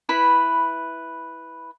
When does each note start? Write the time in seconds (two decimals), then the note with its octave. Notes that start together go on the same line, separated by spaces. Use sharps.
0.09 E4 B4 B5